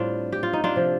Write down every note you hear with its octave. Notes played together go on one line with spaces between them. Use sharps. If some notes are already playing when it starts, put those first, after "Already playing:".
Already playing: A2 G3 C4 D4 F4
G4
F4
D#4
D4 F4
C3 F3